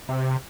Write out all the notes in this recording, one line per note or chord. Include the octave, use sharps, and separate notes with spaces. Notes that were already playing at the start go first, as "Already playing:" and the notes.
C3